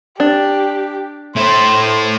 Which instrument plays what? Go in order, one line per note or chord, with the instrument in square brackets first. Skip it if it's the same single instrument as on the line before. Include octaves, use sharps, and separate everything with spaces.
[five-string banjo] D4 [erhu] G4
[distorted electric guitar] A3 E4 [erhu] C5